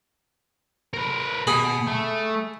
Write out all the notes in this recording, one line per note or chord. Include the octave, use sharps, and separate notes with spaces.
A#4 B4
B2 G#4 B5
A3